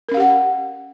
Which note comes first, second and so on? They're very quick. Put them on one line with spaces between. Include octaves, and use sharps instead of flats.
A#4 C#4 F5 G4 F#5